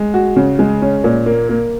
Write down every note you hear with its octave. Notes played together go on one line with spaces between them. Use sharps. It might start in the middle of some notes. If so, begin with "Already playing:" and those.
Already playing: G#3
F#4
C#3
G#3
C#4
A#2
A#3
A#3